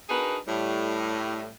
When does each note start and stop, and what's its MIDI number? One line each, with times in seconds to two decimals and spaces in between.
0.10 0.38 62
0.10 0.38 63
0.10 0.38 66
0.10 0.38 68
0.10 0.38 70
0.10 0.38 71
0.47 1.47 45
0.47 1.47 55